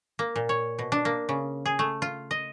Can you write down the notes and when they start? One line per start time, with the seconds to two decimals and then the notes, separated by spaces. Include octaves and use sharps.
0.19 A#3
0.36 A#2
0.49 C#5
0.79 B2
0.92 D4
1.05 A#3
1.29 C#3
1.66 G#4
1.79 A3
2.02 F4
2.31 D#5